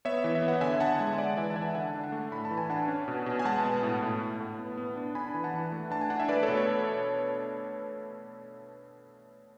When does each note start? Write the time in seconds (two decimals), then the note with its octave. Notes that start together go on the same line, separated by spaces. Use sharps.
0.05 B3 C#5 E5
0.24 E3
0.35 E5
0.42 B3
0.48 F#5
0.61 D3 E5 G#5
0.80 D3 F#5 A5
0.99 G#3 E5 G#5
1.18 G#3 D5 F#5
1.37 E3 E5 G#5
1.50 A5
1.56 E3 E5 G#5
1.75 D3 F#5 A5
1.94 D4
2.04 F#5 A5
2.12 A3
2.32 A2 B5
2.45 A5
2.51 E3
2.58 G#5
2.70 D4 F#5 A5
2.88 C#4
3.08 B2
3.26 B2
3.39 G#5
3.45 G#3 F#5 A5
3.65 B3
3.83 A2
4.03 A2
4.21 A2
4.40 A2
4.59 B3
4.77 B3
4.96 D4
5.15 D4 G#5 B5
5.34 E3
5.44 F#5 A5
5.54 E3
5.72 A3
5.90 D4 A5
6.01 G#5
6.10 D4 F#5
6.20 E5
6.29 A3 B4 D5
6.43 A4 C#5
6.48 B2
6.57 A4 C#5